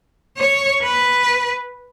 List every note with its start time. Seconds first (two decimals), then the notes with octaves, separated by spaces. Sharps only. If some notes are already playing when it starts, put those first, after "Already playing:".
0.37 C#5
0.83 B4